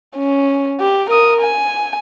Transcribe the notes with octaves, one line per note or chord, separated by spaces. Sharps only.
C#4
G4
A#4 D#6
G#5